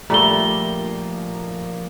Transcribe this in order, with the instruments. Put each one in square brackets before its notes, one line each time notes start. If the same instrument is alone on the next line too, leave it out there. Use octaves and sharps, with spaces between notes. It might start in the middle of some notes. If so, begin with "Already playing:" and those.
[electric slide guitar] F3 A#3 [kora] G3 A4 [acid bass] A3 [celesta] A#5 G7